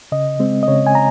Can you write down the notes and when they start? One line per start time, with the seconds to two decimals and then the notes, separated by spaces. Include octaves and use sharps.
0.12 C#3 D#5
0.40 G#3 C4
0.63 D#5
0.68 C#3 C#5
0.87 G#5
0.95 A#5